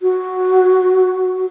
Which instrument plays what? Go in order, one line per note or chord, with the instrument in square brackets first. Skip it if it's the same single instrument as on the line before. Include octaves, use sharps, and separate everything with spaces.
[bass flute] F#4